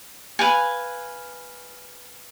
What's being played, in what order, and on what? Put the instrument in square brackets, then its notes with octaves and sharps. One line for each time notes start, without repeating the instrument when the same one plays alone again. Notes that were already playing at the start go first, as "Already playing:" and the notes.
[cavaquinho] B4 F5 G#5